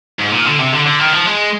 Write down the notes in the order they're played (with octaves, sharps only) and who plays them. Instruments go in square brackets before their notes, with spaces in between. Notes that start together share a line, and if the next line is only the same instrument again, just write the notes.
[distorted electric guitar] G#2
A#2
D3
C3
D3
D3
D#3
F3
G#3